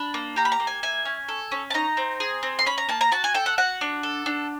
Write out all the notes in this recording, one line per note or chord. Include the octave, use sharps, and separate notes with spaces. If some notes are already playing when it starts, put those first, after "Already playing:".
Already playing: D4 B5
A#3
G4 A#5
B5
A#5
A#3
G#5
E4 G#5
C#4
A4
C#4
A5
D#4 A#5
C4
G#4
C4
C6
C#4 B5
A#5
A#3 A5
A#5
F#4 A5
G#5
A4 G5
F#5
F#4 F#5
D4
A4
D4